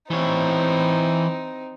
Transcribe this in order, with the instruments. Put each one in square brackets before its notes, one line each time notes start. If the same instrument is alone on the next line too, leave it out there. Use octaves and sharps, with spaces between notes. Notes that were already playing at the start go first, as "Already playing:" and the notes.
[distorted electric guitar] E3 C#5 [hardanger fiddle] C4 D#4